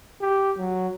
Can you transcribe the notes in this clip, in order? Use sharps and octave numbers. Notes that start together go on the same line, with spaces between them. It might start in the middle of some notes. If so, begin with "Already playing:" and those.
G4
F#3